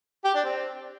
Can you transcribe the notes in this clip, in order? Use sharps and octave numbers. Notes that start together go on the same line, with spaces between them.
G4
D4
C4